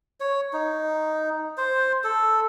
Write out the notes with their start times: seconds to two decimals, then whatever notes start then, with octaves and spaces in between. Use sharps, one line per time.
0.20 C#5
0.53 D#4
1.57 C5
2.04 A4